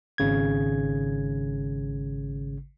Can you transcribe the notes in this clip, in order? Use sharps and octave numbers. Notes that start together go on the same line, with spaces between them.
G#1 C#3 G#6